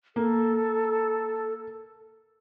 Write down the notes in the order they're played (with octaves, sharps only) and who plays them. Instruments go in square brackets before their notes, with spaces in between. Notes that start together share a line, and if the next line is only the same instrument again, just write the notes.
[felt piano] A#3 [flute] A4